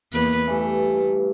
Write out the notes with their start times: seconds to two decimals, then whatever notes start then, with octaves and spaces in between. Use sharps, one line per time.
0.13 E2 A#3 B4
0.47 G2 E3 A3